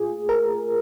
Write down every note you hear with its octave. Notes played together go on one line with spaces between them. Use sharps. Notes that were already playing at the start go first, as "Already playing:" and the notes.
Already playing: A#2 A3 F4 G#4
A#4